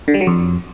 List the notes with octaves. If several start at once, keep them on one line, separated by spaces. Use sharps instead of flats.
D3
G3
F#3
F2